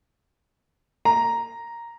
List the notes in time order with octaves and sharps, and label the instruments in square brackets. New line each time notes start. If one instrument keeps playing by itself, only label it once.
[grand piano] A#5